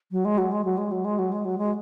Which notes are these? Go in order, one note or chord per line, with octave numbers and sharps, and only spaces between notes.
F#3
G#3
F#3
G#3
F#3
G#3
F#3
G#3
F#3
G#3
F#3
G#3